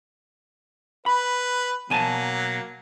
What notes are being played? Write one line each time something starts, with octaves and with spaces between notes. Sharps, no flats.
B4 B5
B2 F#3 A#3 G#5 A5